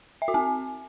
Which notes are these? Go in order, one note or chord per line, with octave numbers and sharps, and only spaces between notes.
E5
F#4
C4